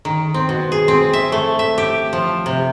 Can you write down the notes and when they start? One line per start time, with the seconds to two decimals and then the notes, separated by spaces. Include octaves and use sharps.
0.05 D#3
0.34 C4
0.49 B2
0.72 G#4
0.88 C4
1.13 E5
1.32 A3
1.59 E5
1.78 G4
2.13 F3
2.46 C3